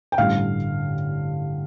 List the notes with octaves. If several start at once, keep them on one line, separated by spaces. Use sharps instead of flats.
G5
A1 G2 D3 F5